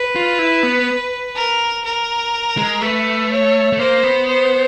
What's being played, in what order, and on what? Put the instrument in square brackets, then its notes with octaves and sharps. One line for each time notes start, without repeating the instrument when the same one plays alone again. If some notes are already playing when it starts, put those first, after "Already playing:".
Already playing: [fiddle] B4
[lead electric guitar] F4
E4
B3
[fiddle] A#4
A#4
[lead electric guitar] G#3
[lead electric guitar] A3 [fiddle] B4
[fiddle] C#5
[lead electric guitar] A3
[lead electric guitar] A#3 [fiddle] C5
[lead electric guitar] B3
[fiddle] C5